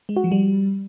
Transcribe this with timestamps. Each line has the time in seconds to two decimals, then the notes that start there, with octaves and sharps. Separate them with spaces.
0.09 G#3
0.16 F#4
0.24 F3
0.32 G3